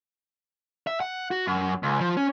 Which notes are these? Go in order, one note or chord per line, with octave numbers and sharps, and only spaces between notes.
E5
F#5
F#4
F#2
C#2
F3
C#4